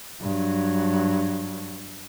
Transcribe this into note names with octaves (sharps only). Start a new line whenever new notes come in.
G2 F#3